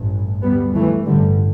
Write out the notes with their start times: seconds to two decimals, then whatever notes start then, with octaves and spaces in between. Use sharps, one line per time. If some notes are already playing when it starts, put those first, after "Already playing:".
Already playing: A1 G2
0.42 D2 G3 B3
0.74 E3 A3
1.06 A1 G2 D3 G3